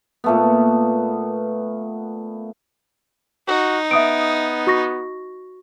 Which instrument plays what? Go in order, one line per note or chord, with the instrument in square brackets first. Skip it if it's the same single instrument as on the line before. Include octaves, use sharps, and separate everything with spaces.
[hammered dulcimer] A#2 A3 B3
[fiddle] D#4 [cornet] F#4
[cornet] B3 [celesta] E5 D#6 D7
[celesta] F#4 C#6 A#6